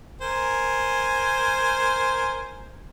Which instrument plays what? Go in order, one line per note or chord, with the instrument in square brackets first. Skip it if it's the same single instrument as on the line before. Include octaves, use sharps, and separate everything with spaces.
[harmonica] A#4 C5 G#5